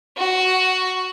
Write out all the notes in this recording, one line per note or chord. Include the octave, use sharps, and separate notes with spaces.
F#4